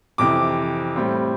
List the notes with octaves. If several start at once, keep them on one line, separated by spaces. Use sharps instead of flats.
F2 C3 E3 D6
A2 G3 C4